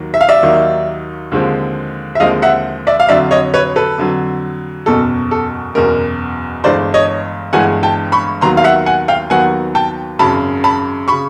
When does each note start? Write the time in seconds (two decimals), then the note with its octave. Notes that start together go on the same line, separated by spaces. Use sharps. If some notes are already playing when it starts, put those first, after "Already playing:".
Already playing: D#2 D#3 F#3 A#3
0.14 E5
0.21 F5
0.29 D5 E5
0.43 D#2 D#3 F#3 A#3 D#4
1.31 D#2 D3 F3 G#3 C4
2.15 E5
2.20 D#2 D3 F3 G#3 C4 D#5 F5
2.42 E5 F#5
2.87 D5 E5
3.00 F5
3.09 F2 D3 F#3 D5 E5
3.31 C#5 D#5
3.54 B4 C#5
3.76 A4 B4
3.98 F2 D3 F#3
4.86 F#1 E2 B2 A4
5.31 A4
5.75 F#1 E2 B2 A#4
6.64 G1 G2 E3 G#3 C5 D5
6.94 C#5 D#5
7.53 G1 G2 E3 G#3 F#5 G#5
7.83 G5 A5
8.12 B5 C#6
8.41 D#2 D#3 F#3 B3 A#5 C6
8.57 F5
8.64 E5 F#5
8.86 F#5 G#5
9.08 F5 G5
9.30 D#2 D#3 F#3 B3 F#5 G#5
9.75 G5 A5
10.19 G#1 F#2 C#3 A5 B5
10.64 A5 B5
11.08 C#3 B5 C#6